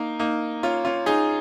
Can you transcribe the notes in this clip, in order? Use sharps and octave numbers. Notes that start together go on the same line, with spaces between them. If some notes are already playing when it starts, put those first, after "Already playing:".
Already playing: A#3 D#4
A#3 D#4
C#4 F4
C#4 F4
D#4 G#4